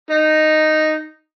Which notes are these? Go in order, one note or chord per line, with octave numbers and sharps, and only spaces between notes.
D#4